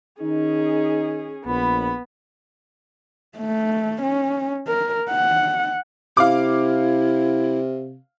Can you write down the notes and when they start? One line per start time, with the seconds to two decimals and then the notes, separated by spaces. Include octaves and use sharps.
0.21 D#3 C#4 D#4 G#4
1.46 A#1 B3 B5
3.38 A3
4.02 C#4
4.68 A#4
5.10 F#5
6.17 C3 E4 F5 D6